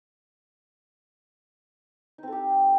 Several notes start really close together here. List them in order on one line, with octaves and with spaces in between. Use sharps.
D#4 C4 A4 G4